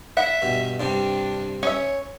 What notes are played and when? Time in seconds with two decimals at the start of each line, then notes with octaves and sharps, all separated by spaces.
0.17 E5 F#5
0.42 G2 B2
0.80 G2 C3 G3 D4
1.63 C#4 C#5 E5